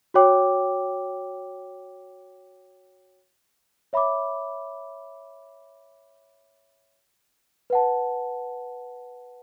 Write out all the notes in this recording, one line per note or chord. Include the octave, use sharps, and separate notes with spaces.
F#4 C#5 G5 D6
C#5 E5 B5 D6
B4 F#5 A5